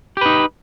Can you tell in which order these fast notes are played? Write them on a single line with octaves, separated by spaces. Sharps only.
G4 B4 D#4